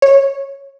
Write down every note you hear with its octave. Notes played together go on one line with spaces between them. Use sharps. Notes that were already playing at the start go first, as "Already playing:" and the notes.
C#5